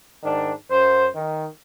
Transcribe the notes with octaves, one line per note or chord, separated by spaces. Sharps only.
G#2 D#3 D4
F#2 C5
D#3